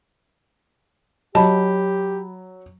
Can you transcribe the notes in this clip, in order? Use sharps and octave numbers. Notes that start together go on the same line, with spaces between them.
F#3 F#4 G4 D#5 A5 B5